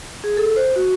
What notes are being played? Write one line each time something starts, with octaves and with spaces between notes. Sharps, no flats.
G#4
A4
C5
F#4